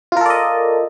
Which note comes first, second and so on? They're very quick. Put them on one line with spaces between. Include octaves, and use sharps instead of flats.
F4 A#4 A4 D5 D#5